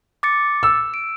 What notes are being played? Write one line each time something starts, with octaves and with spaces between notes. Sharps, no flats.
D6 A6 C#7
E6
D7